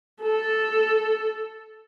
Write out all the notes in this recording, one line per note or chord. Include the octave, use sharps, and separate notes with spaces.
A4